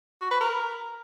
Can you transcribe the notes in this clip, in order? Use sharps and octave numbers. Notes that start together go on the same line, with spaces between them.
F#4
B4
A#4